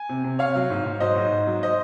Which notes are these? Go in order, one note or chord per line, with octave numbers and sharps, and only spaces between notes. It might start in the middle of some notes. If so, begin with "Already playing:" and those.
Already playing: G#5
C3
C3
C3 C#5 F5
F#3
G#2
G#2
F#3 C5 D#5
G#2
G#2
F#3
C5 D#5